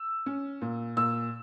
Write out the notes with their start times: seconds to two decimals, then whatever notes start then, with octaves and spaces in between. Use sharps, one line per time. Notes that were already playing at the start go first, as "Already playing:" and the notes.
Already playing: E6
0.26 C#4
0.61 A#2
0.97 A#2 E6